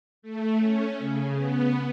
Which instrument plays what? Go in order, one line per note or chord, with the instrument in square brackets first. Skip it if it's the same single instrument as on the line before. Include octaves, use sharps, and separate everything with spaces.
[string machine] A3
C#4
C#3
B3